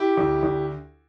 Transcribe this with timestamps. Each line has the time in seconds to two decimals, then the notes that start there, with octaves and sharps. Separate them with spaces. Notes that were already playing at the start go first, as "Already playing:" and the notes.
Already playing: E4 G4
0.17 D2
0.43 D2